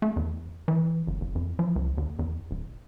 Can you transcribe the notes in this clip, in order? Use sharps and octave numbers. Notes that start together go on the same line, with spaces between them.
A3
E2
E3
G1
F#1
F2
F3
C#2
D#2
E2
D#1